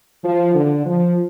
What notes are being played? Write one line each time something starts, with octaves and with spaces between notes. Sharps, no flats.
F3
D3
F3